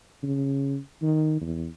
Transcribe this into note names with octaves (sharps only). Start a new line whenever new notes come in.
C#3
D#3
E2